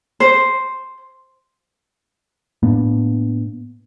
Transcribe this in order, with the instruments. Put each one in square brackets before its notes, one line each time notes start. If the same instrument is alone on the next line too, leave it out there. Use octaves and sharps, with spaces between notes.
[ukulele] C5
[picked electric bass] A2 A#3 B3 D4